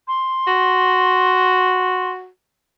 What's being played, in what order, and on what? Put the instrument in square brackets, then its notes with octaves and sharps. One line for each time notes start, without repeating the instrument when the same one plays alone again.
[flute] C6
[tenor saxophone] F#4